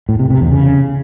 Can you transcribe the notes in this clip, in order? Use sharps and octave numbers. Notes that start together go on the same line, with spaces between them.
A2
C3
C3
E2
C#3